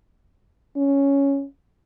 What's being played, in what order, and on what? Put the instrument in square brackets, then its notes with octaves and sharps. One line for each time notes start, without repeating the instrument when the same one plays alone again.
[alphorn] C#4